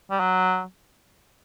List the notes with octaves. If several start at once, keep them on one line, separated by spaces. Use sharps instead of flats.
G3
F#3